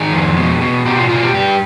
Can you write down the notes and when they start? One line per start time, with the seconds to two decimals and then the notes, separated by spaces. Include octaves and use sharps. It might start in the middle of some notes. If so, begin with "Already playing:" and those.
Already playing: D#3 G#4
0.12 F2
0.36 B2
0.61 B2
0.85 B2 G4
0.98 F4
1.09 B2 F4
1.23 G4
1.34 G2 G4